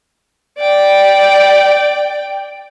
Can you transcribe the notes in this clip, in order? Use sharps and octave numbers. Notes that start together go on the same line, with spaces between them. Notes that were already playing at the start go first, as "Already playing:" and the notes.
D5 G5